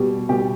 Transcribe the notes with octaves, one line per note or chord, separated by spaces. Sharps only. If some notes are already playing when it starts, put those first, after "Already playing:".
Already playing: B2 G3
B2 G3 G4